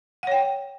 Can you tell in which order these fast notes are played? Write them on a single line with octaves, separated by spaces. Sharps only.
F#5 C#5 G5